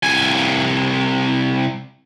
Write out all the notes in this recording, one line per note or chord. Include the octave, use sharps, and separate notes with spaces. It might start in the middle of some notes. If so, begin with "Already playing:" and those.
C2 G#5